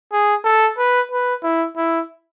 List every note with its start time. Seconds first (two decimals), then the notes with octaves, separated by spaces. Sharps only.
0.12 G#4
0.45 A4
0.78 B4
1.11 B4
1.43 E4
1.77 E4